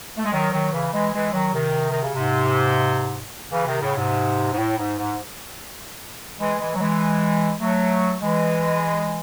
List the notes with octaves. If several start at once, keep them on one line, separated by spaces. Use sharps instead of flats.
A3
G#3
D#3 F#3
D#3 F#3
C#3 E3
E3 G#3
E3 G#3
D#3 F#3
C3 D#3
D#3
C#3
G#2 C3
C#3 E3
C3 D#3
A2 C#3
G#2 C3
G#2
A2
G#2
G#2
E3 G#3
E3 G#3
F#3
E3 G#3
F#3 A3
E3 G#3